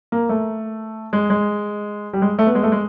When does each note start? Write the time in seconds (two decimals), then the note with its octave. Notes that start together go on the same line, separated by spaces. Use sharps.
0.12 A#3
0.29 A3
1.13 G#3
1.30 G#3
2.13 G3
2.22 G#3
2.39 A3
2.47 B3
2.55 G#3
2.63 A3
2.72 G#3